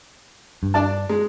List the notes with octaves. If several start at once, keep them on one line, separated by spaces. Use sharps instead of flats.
G2
D4 D5 A5
G#3